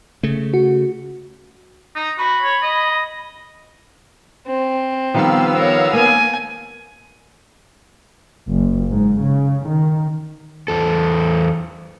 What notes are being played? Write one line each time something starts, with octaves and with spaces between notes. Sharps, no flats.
C#3 A3
F#4
D#4
F#4 B5
C#5
D#5
C4
D#3 F3 G3 B3 F5 E6
A#4 C#5
A#3 G#5
F#1
G#2
C#3
D#3
E2 A4